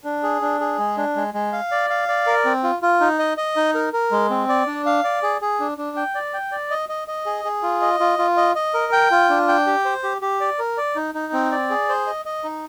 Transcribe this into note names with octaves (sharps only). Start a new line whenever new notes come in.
D4
G#4
D4
G#4
G#3
D4
G#3
G#3
F5
D5
F5
D5
A#4
C4
F4
F4
D#4
D#5
D#5
D#4
A#4
A#4
G#3
C4
D5
D4
F5
D5
G#4
G#4
D4
D4
G5
D5
G5
D5
D#5
D#5
D#5
G#4
G#4
F4
D#5
F4
F4
D#5
D#5
A#4
G5
F4
D4
G5
G4
C5
G4
G4
D5
A#4
D5
D#4
D#4
C4
D5
G#4
C5
D#5
D#5
D#4